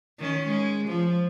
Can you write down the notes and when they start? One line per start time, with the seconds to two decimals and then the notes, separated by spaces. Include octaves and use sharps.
0.19 D#3 C#4
0.47 G#3
0.88 F3